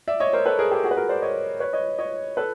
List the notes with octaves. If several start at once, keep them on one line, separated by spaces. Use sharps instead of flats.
D5 E5
C#5 D#5
A#4 C5
A4 B4
G#4 A#4
G4 A4
F#4 G#4
B4
G#4 A#4
C5 D5
C#5 D#5
B4 C#5
C#5 D#5
C#5 D#5
A4 B4